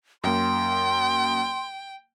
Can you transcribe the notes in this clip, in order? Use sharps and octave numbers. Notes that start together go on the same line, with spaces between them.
F#2 A#3 G5 C6